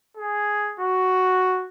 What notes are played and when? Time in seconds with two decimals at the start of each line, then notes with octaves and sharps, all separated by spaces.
0.17 G#4
0.80 F#4